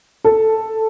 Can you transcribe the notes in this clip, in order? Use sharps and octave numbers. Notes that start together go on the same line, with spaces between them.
A4